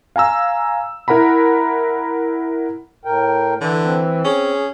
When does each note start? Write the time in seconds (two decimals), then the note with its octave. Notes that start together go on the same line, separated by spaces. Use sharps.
0.16 F5 G#5 A#5 E6
1.08 E4 A#4 F#5 A#5 B5
3.05 A2 A#4 G5
3.61 D3 E3
3.83 C4
4.25 C#4 G#4